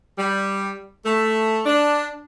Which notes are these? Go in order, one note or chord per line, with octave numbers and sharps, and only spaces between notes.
G3
A3
D4